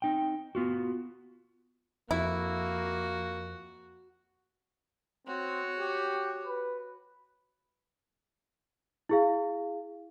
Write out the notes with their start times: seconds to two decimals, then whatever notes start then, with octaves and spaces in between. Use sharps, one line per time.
0.02 C4 D#4 G5
0.55 B3 F4 F#4
2.11 F2 A#3 E4 F#4
5.27 C4 F#4 C#5
5.78 G4
6.47 B4
9.09 E4 G#4 F5